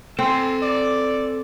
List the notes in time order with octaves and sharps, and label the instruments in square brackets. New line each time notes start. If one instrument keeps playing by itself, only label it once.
[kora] C4 [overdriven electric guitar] A4 G#5
[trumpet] D5